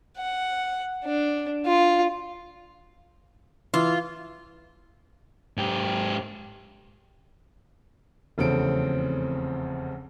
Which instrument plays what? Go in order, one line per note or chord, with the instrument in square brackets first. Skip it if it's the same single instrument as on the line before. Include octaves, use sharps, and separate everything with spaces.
[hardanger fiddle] F#5
D4
F4
[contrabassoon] E3 [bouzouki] F4
[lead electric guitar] G#2 G4
[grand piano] F1 E2 C#3 C4 A4 D7